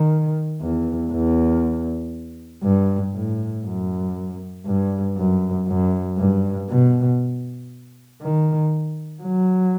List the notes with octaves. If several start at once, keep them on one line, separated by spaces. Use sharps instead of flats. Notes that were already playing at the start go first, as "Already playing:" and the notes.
Already playing: D#3
E2
E2
G2
A2
F#2
G2
F#2
F#2
G2
B2
D#3
F#3